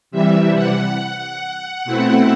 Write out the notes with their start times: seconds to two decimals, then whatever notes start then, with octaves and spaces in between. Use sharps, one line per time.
0.11 C3 E3 G3 E5
0.55 F#5
1.84 B2 A3 C4 E4